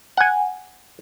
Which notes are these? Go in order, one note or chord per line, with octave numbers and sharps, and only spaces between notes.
F#5 G#5